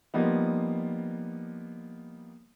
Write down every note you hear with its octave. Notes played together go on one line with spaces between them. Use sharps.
F3 G3 A#3 B3 D#4